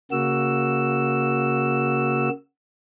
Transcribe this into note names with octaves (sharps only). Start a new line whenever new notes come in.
C#3 A#3 F#4 E6